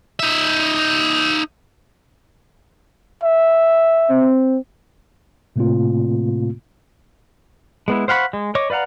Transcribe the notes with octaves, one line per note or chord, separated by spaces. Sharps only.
D#4 E5
E5
C4
A2 C3 A3 A#3 C4 F4
G#3 B3 E4
C5 F5 F#5 B5 C#6
G#3
C#5 D#5 C#6 D6
B4 D5 F5 F#5 A#5